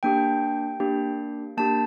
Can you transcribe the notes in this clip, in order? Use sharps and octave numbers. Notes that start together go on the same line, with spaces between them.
A#3 D4 G4 G5
A#3 D4 G4
A#3 D4 G4 A5